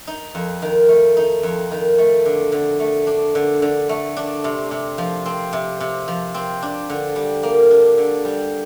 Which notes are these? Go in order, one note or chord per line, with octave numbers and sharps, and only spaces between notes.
D#4
F2
D#3
A3
D#4
F2
D#3
A3
D3
D3
A3
D4
D3
D3
A3
D4
C3
C3
F3
C4
C3
C3
F3
C4
D4
D3
G3
A#3
D4
D3
G3